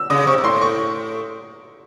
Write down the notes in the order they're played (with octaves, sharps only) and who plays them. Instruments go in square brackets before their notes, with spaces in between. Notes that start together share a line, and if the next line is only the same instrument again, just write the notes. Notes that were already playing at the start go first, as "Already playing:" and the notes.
Already playing: [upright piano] E6
[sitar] C#3 [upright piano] D#6
[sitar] C3 [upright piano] C#6
[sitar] C3
[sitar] A2 [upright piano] C6
[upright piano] C#6